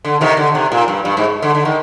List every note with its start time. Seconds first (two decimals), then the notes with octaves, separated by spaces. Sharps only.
0.05 D3
0.21 C3 D#3
0.37 D3
0.55 C3
0.72 A#2
0.88 G2
1.05 G2
1.17 G#2
1.42 D3
1.55 D3
1.65 D#3